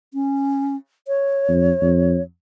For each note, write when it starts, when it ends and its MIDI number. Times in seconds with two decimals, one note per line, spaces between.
0.14 0.76 61
1.08 2.22 73
1.48 1.72 41
1.81 2.18 41